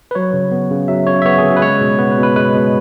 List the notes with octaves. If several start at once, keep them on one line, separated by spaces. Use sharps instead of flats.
B4
F#3 C#5
C#3
B3
C#3
F#3 E5
C#3 C#5
E5
B3 C#5
G#4
C#3
F#4
B4
G#3 C#5
B2
B3 B4
B4
B2
B4
G#3 B4
B2